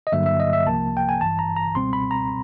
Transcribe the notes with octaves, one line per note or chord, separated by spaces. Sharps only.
D#5
G2 D3 F#3 A#3 E5
E5
D#5
E5
C2 C3 F3 A#3 A5
G5
G#5
G#1 G2 E3 A5
A#5
A#5
C#2 B2 G3 C4 C6
B5
A#5